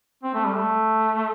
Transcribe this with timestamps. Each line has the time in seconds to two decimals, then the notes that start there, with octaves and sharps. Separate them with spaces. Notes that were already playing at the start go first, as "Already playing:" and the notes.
0.23 C4
0.34 A3
0.46 G3
0.57 A3